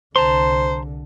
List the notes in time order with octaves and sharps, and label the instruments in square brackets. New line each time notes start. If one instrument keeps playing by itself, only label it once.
[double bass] C2 D3 [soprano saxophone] C5 [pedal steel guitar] A5 A#5 C6